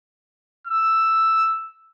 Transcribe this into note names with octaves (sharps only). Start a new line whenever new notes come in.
E6